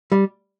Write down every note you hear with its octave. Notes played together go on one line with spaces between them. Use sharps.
G3